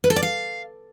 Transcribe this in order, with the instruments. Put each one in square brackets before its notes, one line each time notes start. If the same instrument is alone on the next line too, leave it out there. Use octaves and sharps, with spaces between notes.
[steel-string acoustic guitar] B4
A4
D5
F5